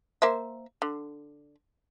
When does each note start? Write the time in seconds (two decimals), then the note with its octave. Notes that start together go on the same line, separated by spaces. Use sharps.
0.22 A#3 C5 E5
0.82 D3